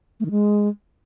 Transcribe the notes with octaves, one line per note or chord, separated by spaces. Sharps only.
A3
D#3
G#3